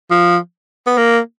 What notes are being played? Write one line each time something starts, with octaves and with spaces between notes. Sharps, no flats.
F3
B3
A#3